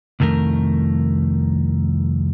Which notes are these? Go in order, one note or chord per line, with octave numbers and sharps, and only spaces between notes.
C2 F2 D#3 A3 A#4